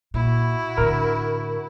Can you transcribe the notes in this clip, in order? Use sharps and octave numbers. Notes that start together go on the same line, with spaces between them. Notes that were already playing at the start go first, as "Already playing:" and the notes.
A#2 E4 F#4
A2 D3 A#4